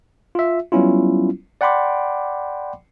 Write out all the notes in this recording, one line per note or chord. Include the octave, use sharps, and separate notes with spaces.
F4 E5
F#3 G3 B3 C#4 E4 F4
D5 F#5 G5 B5 C6 D6